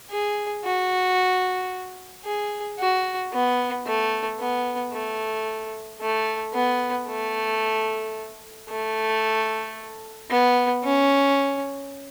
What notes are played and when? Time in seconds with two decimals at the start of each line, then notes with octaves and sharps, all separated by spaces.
0.11 G#4
0.64 F#4
2.25 G#4
2.79 F#4
3.33 B3
3.87 A3
4.40 B3
4.93 A3
6.01 A3
6.54 B3
7.08 A3
8.69 A3
10.30 B3
10.84 C#4